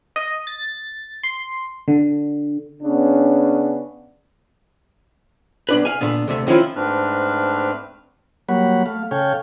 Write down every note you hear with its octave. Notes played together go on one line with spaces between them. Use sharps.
D#5
A6
C6
D3
C#3 B3 C#4 D4
B1 D4 B4
F5 G#5
A#2 D3 B3
D2 C3 A3
D#3 F3 C#4 E4 F4
G#2 A3 C4 D4 B4 F6
F#3 G3 A#3 C#5 F#5 B5
A3 F5
C#3 A4 C#5 F5 G5 G#5